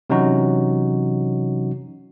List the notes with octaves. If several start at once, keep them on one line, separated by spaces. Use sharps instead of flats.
C3 E3 F#3 C#4 D#4 F#4